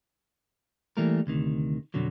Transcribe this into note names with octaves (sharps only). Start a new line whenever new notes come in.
E3 G3 A3 A#3 A#4
D2 C3 D#3
F2 B2 D3 F#3